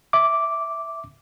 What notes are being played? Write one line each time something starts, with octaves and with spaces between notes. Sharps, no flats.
E5 D6